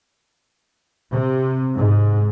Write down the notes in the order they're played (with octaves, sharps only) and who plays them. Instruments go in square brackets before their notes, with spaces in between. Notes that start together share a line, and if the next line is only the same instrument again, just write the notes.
[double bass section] C3
G#2